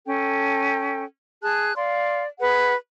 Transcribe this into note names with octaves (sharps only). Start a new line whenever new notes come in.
C#4 A4 G5
G#4 A5 F#6
D5 F5 C6
G#4 B4 F#5